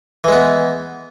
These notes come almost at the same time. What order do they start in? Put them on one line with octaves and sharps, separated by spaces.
E3 G#3 B3